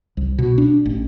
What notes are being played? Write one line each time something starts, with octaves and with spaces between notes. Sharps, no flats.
C2
B2
D4
A1